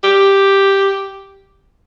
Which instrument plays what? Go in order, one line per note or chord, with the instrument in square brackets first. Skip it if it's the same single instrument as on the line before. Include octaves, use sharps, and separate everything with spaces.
[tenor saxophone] G4